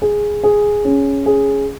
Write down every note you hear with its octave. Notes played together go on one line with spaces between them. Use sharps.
G#4
G#4
C#4
G#4